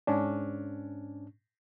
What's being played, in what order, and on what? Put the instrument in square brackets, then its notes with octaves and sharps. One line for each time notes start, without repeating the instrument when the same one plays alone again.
[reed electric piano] G#2 C#4 D4